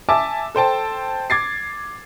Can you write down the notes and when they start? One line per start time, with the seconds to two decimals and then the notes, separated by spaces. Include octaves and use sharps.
0.09 E5 G#5 A5 D6 E6
0.55 A4 C5 G5 A5
1.30 D6 G#6 A6 C7